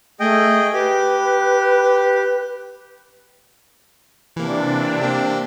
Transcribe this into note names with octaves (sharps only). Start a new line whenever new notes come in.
A3 G#4 D#5 G5
G4 B4
C3 E3 A#3 D4
A#3 C4 G4